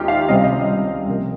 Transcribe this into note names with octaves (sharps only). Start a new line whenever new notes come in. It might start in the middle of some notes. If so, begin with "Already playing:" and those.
Already playing: D#2 D#3 G#3 C#4 D#4 F4 G4
F5
C#2 C3 G3 C4 D#5
F5
D#5
C3 F3 A#3